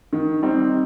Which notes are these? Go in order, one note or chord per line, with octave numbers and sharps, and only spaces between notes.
D#3
G3 C4 D#4